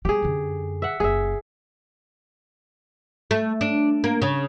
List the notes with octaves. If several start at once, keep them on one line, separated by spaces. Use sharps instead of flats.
G3 B3 G4 G#4
F#2 D3
E5 F#5
F#1 A#3 G#4 E5
A3
D4
A#3
C#3